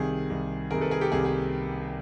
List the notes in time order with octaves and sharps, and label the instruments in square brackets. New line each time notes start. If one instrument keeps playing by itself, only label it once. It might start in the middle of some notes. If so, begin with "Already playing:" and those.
Already playing: [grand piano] C2 C3 D#3 G#4
C2 C3 D#3
C2 C3 D#3 G#4 A#4
A4 B4
G#4 A#4
G4 A4
C2 C3 D#3 G#4
G#4